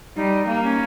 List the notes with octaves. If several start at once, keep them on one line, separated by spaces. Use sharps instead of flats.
G3 D#4
A#3
C#4